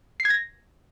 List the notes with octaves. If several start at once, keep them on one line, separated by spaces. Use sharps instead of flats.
C7
G#6
A#6